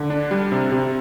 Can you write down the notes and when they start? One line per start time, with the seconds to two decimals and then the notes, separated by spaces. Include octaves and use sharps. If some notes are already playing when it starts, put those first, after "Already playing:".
Already playing: D3
0.10 D4
0.31 G3
0.52 C3
0.72 C3